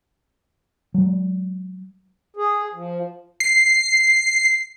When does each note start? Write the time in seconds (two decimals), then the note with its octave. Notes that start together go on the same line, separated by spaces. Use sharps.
0.94 F#3 G#3
2.36 G#4
2.74 F3
3.40 C7